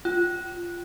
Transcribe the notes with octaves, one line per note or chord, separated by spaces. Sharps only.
F4